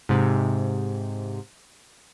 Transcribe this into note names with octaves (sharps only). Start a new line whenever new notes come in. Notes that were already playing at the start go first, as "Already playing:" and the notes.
G#2 C3